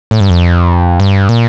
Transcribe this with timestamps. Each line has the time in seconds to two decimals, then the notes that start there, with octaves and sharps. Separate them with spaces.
0.11 A2
0.20 G2
0.30 F2
1.00 G2
1.29 A#2